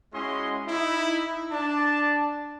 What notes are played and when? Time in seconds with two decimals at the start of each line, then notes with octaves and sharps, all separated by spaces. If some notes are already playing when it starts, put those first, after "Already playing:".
0.13 G#3 C#4 E4 F#4 D#5 C6
0.67 D#4 E4
1.51 D4 A5